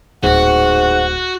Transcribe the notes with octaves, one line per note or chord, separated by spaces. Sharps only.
D1 G#2 F#4 F#5